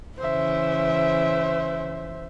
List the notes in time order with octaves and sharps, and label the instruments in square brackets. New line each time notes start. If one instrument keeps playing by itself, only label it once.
[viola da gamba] C#3 E3 [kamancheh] C5 E5